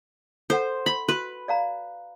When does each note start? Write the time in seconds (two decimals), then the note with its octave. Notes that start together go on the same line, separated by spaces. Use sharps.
0.50 A4 C5 F#5
0.86 B5
1.09 F#4 B4
1.48 D5 F5 A#5